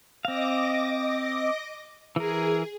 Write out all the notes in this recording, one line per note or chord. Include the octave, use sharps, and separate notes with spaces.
C4 D#5 F5 D6 A#6
E3 G#4 A#4